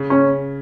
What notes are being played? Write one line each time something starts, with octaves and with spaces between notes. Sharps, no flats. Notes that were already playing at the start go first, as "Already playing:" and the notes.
Already playing: C#3
C#4